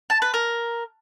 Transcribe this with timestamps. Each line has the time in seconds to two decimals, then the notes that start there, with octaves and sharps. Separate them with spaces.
0.10 A5
0.22 B4
0.34 A#4